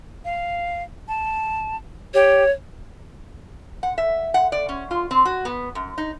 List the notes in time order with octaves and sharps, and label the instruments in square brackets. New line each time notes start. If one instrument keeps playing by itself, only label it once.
[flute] F5
A5
[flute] G4 [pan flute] C#5
[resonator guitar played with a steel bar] F#5
E5
F#5
D5
C#4
F4
C4
F#4
B3
F#2
D#4